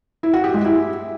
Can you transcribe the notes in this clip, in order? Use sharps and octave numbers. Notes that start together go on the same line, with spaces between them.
E4
F#4
G4
G#3
E4